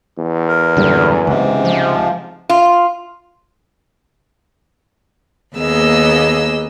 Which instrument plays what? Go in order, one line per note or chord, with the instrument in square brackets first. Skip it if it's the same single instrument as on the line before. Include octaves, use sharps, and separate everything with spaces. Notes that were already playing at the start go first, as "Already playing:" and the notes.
[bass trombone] E2
[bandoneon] A#4
[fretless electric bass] D#1 D3 G3 [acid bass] F#2
[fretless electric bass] C#2 [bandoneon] G#2 C3
[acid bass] F3
[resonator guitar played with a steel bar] F4
[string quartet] D#2 A#3 B3 G#4 D#5 E6